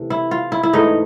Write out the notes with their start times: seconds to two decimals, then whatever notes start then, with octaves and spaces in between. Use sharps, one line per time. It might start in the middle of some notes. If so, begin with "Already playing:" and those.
Already playing: C3 E3 A3
0.10 E4
0.31 F4
0.52 E4
0.63 E4
0.73 G#2 E3 A3 D#4